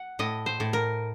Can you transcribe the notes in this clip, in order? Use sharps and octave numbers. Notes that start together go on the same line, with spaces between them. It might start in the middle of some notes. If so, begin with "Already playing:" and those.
Already playing: F#5
A2 D#5
C5
A2
A#4